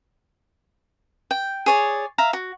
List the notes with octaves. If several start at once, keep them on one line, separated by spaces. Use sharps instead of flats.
G5
G#4 C#5 D5
E5 F5 A#5
F#4